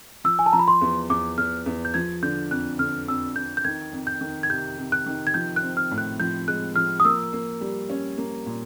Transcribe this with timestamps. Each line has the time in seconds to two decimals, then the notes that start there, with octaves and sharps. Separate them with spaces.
0.24 F3 E6
0.39 G#5
0.46 A5
0.53 F3 A#5
0.59 B5
0.68 C6
0.81 E2
1.09 E2 D6
1.38 E2 F6
1.66 E2
1.85 G6
1.94 F3 G#6
2.23 D3 G6
2.51 F2 F#6
2.79 D3 F6
3.08 F2 E6
3.36 F2 G6
3.57 G6
3.65 D#3 G#6
3.93 F2
4.07 G6
4.21 D#3
4.43 G#6
4.50 C3 G6
4.78 C3
4.92 F#6
5.06 D#3
5.27 G#6
5.34 F3 G6
5.56 F#6
5.63 C4
5.77 F6
5.91 A2
5.98 F#6
6.20 F3 G6
6.48 G#3 F#6
6.76 F3 F6
7.00 D#6
7.05 A#3 E6
7.33 A#3
7.61 G3
7.90 C#4
8.18 A#3
8.46 A#2